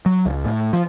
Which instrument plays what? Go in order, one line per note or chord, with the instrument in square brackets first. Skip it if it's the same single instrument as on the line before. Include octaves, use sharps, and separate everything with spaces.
[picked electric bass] F#3
C#2
A2
F3